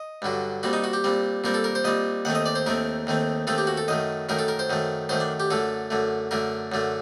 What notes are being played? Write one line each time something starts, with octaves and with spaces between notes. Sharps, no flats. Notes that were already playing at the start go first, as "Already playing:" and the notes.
Already playing: D#5
G2 D3 F#3
A#2 G3 C4 F#4
D#4
F#4
G4
A#2 G3 C4
A#2 G3 C4 A#4
A4
A#4
C5
A#2 G3 C4 D#5
D#2 D#3 A3 C4 F#5
D#5
D5
C5
D#2 D#3 A3 C4 A#4
D#2 D#3 A3 C4
D#2 D#3 A3 C4 A4
G4
F#4
A4
F#2 D#3 A3 D#5
F#2 D#3 A3 A#4
A4
A#4
C5
F#2 D#3 A3
F#2 D#3 A3 C5
D4
G4
F#2 D3 A3 A4
F#2 D3 A3
F#2 D3 A3 A#4
F#2 D3 A3